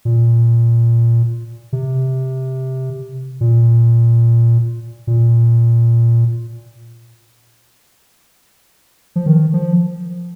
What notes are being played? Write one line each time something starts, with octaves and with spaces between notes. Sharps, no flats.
A#2
C3
A#2
A#2
F3
D#3
F3